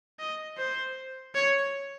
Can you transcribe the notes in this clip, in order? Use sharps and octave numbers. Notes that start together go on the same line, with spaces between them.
D#5
C5
C#5